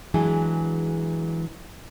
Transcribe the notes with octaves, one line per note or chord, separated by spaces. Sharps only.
E3 F#3 G#3 D4 G#4